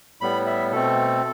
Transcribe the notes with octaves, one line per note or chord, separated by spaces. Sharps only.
A2 G3 B3 B5
E5
B2 A3 C4 A4